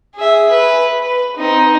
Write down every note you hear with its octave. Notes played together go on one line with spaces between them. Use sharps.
G#4 E5
B4
B4
C4 D#4